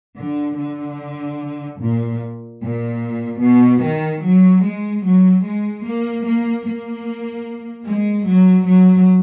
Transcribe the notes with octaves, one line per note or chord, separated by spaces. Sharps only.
D3
D3
A#2
A#2
B2
D#3
F#3
G#3
F#3
G#3
A#3
A#3
A#3
G#3
F#3
F#3